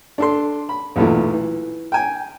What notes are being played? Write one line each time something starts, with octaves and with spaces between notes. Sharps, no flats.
D4 A4 C6
B5
B1 E2 A#2 A3
E3
G5 G#5